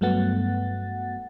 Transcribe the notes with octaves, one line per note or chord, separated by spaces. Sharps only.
G2 F#3 A3 B3 F#5 A6